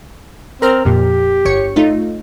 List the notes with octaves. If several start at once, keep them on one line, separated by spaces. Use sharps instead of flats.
C4 A#4 A#5 F6
F2 A#2 G4
G1 C#5 C#7
A3 D#4 F4